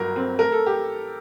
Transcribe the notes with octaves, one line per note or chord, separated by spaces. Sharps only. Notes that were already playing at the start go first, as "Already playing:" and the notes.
Already playing: G1 F#3 A#4
C4
A3 A#4
A4
G4